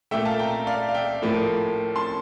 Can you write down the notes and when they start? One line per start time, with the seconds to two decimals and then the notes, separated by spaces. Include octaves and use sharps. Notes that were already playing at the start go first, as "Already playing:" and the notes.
0.11 A#2 A3 E5 G5
0.25 F5 A5
0.39 G5 A#5
0.67 D5 F5
0.88 F5
0.94 E5 G5
1.22 A2 F3 A#3
1.96 A5 C6